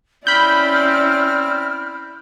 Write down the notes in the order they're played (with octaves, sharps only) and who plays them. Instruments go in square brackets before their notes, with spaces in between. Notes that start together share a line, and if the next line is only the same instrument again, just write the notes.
[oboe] C4 [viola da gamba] C#4 E4 D5 [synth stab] B5 G6 [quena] F6